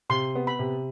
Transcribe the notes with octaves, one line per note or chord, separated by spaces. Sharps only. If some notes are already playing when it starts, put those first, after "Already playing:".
C3 C6
B3
B5
C3